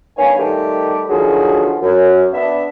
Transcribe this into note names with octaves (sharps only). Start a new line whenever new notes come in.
G2 D#3 B3 C#5 F5 G#5
D#3 G3 A3 G4
D3 D#3 F3 F#3 F#4 G#4
F#2
B3 D4 E5